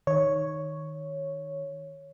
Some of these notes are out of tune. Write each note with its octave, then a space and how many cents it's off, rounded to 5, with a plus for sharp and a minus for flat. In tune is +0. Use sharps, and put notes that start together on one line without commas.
D#3 +0 C#5 +0